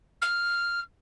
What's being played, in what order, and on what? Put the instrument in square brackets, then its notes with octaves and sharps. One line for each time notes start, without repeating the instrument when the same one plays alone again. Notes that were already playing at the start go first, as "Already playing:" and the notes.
[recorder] F6